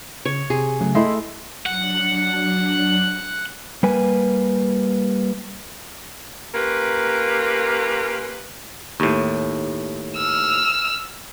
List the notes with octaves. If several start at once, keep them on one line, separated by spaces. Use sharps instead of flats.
C#3 C#5
C3 G#4
C#3 F#3 A3
A3 E4 D#5 E5 C6
F#3 D4 F#5
G3 A#3 B4 G#5
A#3 C#4 F4 G4 A#4 B4
D#2 A2
E6 F6